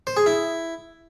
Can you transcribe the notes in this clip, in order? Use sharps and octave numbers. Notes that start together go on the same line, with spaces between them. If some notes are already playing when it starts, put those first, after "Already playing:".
C5
G#4
E4